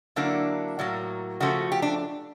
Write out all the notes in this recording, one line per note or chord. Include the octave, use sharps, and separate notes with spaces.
D3 F#3 A#3 D4 E4
A2 F#3 A#3
C#3 F3 A3 F#4
G4
D4